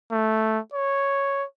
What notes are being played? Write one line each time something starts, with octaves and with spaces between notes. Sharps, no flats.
A3
C#5